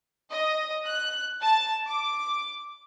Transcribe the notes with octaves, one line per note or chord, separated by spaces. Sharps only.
D#5
F#6
A5
D6